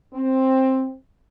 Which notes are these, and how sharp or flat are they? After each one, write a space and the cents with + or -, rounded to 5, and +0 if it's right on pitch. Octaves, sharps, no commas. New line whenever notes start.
C4 +10